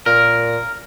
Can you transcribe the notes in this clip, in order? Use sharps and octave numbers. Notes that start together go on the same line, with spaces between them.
A#2 A#4